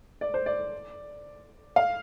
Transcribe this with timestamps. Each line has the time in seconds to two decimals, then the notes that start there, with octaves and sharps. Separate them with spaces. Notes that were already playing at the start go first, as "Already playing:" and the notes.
0.21 D5
0.34 C5
0.46 D5
1.76 F5